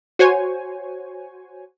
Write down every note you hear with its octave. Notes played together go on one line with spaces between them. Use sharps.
F#4 C5 C#5 G#5